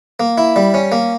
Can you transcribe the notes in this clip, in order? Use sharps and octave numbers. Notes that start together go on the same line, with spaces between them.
A#3
E4
G3
C#4
A#3